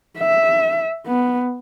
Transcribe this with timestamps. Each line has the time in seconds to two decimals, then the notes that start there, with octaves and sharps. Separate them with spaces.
0.19 E5
1.07 B3